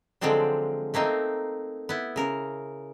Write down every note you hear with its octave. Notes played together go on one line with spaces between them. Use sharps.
D3 F3 F#3 G#3 C4 D4
A3 A#3 C4 D#4
B3 E4
C#3 A#4